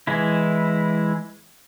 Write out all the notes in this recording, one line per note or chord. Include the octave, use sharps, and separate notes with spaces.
E3 G#3 E4